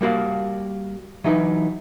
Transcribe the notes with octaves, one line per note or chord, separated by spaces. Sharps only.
G3 A#3 F#4 F5
E3 F#3 D#4 B4